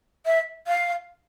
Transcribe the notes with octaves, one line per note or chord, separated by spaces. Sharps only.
E5
F5